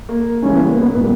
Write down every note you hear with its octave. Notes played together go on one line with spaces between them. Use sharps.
A#3
C#3 E3 G3 C#4
B3
A#3
B3
A#2 G3 B3